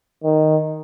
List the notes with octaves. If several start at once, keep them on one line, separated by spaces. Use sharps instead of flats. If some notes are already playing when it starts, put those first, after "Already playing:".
D#3